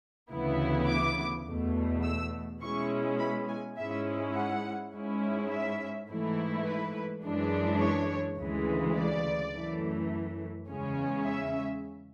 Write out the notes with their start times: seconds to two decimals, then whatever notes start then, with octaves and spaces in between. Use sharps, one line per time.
0.31 D2 C#3 E3 B3 E4
0.88 D6
1.46 E2 B2 A3
2.04 E6
2.61 B2 G#3 C#4 E4 C#6
3.19 B5
3.48 G#5
3.76 G#2 G#3 C#4 E4 E5
4.34 F#5
4.92 G#2 G#3 C#4 E4
5.49 E5
6.08 G#2 E3 A3 E4
6.65 B4
7.23 F#2 E3 G#3 D4
7.80 C#5
8.38 D2 C#3 E3 G#3
8.96 D5
9.53 F#2 E3 A3
10.69 E2 C#3 G#3 C#4
11.26 E5